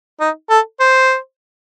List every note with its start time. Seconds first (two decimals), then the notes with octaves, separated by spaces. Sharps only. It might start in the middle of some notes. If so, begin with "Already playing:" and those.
0.20 D#4
0.50 A4
0.80 C5